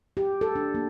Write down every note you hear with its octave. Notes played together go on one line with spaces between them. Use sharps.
G4
A4
D4
A#3